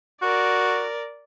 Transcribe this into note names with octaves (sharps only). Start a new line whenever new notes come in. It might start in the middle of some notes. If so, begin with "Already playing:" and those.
F#4 A#4 D5